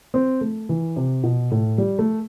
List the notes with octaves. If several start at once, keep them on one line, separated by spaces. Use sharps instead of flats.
C4
A3
E3
C3
B2
A2
G3
A3